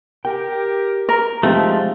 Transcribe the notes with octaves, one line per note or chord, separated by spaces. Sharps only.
G4 A#4 G5
A#4
F3 G#3 A3 C4 D#4 G4